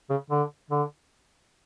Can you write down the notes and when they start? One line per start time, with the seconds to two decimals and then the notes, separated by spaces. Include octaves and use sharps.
0.10 C#3
0.30 D3
0.71 D3